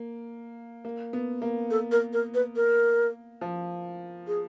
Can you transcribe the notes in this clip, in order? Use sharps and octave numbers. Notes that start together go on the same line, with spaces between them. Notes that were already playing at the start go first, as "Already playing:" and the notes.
Already playing: A#3
A#3
B3
A#3
A4
A#4
A#4
B4
A#4
F3
G#4